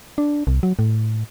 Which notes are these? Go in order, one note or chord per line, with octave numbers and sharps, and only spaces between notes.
D4
C2
F#3
A2